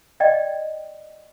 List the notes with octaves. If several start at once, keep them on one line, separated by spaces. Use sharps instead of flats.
D5 D#5 G5